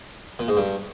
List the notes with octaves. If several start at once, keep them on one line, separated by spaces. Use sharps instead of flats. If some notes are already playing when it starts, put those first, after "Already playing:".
A#2
G#2
G2